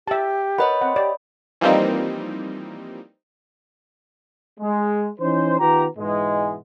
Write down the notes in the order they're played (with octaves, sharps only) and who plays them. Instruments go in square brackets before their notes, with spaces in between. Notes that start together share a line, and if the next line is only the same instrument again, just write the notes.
[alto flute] G4 [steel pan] E5 A5
[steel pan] A#4 B4 F#5 [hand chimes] C#5 D#5 B5
[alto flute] C4 [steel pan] F#5
[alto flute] G4 [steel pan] D5
[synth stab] E3 F3 G3 A#3 C4 D#4
[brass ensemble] G#3
E3 C#4 D#4 C5
D#3 B3 F4 G4 A#5
G#2 B2 E3 G#3